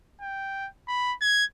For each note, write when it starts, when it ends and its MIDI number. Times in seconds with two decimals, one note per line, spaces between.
0.21 0.67 79
0.88 1.14 83
1.21 1.45 92